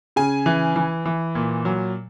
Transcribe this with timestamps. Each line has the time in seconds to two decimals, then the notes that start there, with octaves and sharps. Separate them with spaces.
0.16 C#3 G#5
0.46 E3
0.76 E3
1.06 E3
1.35 A#2
1.65 F#3